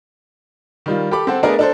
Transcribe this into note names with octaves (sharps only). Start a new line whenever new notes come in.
D#3 G3 F4
G4 A4 B5 D6
C4 A4 C5 F#5
A3 B3 D4 G#4 A#4 D5
D4 A4 C5